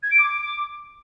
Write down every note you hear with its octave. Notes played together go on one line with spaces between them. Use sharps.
G#6
D7
D6